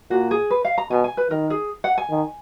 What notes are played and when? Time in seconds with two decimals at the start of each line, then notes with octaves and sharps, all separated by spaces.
0.10 A#2 F#4
0.31 G#4
0.51 B4
0.65 F5
0.78 A#5
0.91 B2 G#5
1.04 G#5
1.17 B4
1.30 D#3 A#4
1.50 G#4
1.84 F#5
1.98 G#5
2.10 D#3